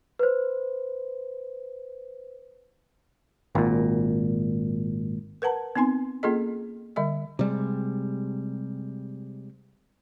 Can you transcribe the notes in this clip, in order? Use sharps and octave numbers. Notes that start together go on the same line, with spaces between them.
B4 C5
G#1 A#2
A#4 B4 F#5 A5 A#5
B3 C4 D#4 G#5 C6
A#3 C#4 F4 G#4 A4 D#5
D3 G3 D#5 E5
C3 G3 G#3